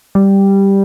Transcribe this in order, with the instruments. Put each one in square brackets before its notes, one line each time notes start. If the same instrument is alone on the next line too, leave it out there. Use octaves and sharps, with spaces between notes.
[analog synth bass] G3